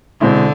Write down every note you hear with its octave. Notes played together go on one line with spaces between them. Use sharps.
B2 D3 G#3 C4 E4